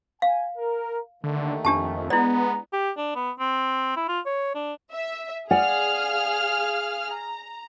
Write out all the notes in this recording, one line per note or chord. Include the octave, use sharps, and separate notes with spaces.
F5 G#5
A#4
D#2 D3 D#3 A3
F2 D4 G4 A5
G#3 B3 E4 D5 A#5
G4
D4
B3
C4
E4
F4
C#5
D4
E5
G#4 D5 F5 F#5 G#5 F6
A#5